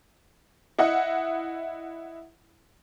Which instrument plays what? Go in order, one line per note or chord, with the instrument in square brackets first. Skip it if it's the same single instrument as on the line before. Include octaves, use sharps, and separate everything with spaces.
[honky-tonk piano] E4 D#5 F#5